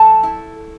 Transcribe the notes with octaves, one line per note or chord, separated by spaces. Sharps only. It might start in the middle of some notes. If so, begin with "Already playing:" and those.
Already playing: F#3 A3 A4 A5
E4